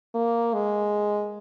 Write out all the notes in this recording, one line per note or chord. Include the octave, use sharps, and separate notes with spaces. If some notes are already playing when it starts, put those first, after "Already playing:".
A#3
G#3